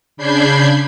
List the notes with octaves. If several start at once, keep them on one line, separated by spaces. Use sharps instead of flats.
C#3 D4 B5 G6 G#6 C7